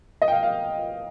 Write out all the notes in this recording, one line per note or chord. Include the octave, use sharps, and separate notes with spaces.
D#5
G5
F5
F5